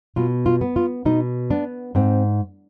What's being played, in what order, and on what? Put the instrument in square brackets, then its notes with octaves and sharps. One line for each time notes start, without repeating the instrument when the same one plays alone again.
[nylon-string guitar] B2 F4
F4
B3
F4
B2 D#4
B3 D4
G#2 C4